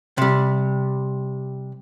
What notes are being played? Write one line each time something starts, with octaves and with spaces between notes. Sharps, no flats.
C3 G3